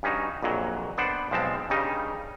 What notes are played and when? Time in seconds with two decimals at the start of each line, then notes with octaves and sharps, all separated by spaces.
0.03 G2 C#4 D#4 F#4
0.43 A#1 F2 A#2 F#3
0.98 B3 D4 C5 D5 F#5
1.31 B1 F3 G#3 C4 A5
1.70 G2 C#3 G3 D#4